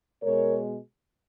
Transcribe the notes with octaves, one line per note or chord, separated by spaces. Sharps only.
B2 G#3 A#4 C#5